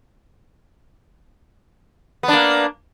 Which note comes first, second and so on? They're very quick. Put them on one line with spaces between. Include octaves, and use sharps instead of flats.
B3 D4 A#3